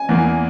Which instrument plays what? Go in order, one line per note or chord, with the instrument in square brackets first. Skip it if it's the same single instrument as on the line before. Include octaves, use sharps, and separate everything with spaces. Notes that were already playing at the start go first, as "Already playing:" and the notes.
Already playing: [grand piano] G#5
E2 E3 A#3